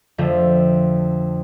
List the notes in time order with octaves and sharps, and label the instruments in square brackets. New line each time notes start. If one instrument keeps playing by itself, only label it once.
[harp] F2 D3 F3 A3